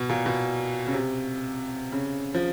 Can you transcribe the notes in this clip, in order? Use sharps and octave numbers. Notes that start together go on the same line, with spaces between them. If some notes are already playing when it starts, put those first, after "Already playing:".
Already playing: B2
A#2
B2
C#3
C3
C#3
F3